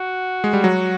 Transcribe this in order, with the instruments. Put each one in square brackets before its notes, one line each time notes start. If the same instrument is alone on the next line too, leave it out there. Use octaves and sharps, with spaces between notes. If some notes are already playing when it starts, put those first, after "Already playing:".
Already playing: [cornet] F#4
[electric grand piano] G#3
G3
F#3